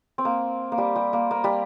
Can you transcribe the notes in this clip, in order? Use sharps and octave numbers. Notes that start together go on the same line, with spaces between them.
C4
A#3
A#3
G3
G3
A#3
A#3
G3